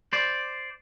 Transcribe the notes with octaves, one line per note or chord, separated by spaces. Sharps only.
C5 D5